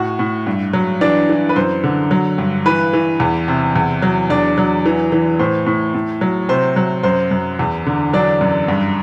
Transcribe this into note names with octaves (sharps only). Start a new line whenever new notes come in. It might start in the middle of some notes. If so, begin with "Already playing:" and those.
Already playing: A2 F#4 F#5
A2
G2
F#3
E3 D4 D5
E3
B4
F#2 C5
D3
F#3
G2
E3 B4
E3
E2
C3
E2
F#3
E2 D4 D5
F#3
E3
E3
A2 C5
A2
A2
F#3
C3 C5
F#3
F#2 C5
F#2
E2
D3
F#3 D4 D5
F#2
G2